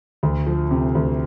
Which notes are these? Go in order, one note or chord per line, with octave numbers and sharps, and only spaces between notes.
D2
F3
C3
D2